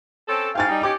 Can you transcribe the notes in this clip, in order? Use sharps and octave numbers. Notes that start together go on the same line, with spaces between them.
C4 C#4 A4
G#2 F5 G5 G#5 A6
G3 D#4
C#4 D#4 G4 D6